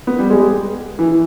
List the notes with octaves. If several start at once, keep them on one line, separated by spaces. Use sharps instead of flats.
B3
G3
G#3
E3